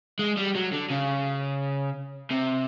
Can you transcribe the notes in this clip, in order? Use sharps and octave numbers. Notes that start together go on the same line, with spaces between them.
G#3
G3
F#3
D3
C#3
C3